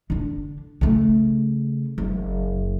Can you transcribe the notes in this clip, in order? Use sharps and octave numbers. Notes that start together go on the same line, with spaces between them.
D3 D4
C#3 A3
F#1